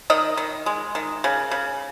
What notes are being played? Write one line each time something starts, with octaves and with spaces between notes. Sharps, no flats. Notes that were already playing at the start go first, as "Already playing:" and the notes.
D#3 D#5
D#3
G#3
D#3
C#3
C#3